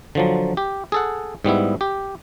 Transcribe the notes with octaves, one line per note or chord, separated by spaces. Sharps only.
D3 F3 F#3
G4
G#4 A4 F#5
G#2 G3 B3 E4
G4